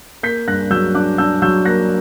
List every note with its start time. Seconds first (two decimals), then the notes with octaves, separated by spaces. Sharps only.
0.23 A#3 G6 B6
0.48 G2 F#6 A#6
0.70 F#3 E6 G6
0.95 D4 D6 F#6
1.18 D4 E6 G6
1.42 F#3 E6 G6
1.65 A#3 F#6 A#6